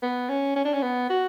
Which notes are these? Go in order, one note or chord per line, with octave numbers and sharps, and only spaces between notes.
B3
C#4
C#4
D4
C#4
B3
F#4